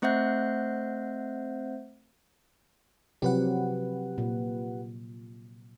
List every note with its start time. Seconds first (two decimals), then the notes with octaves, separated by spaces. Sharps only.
0.02 A3 C4 C5 E5 F#5 G6
3.22 C3 F3 F#3 G4 B4 F#5
4.18 A#2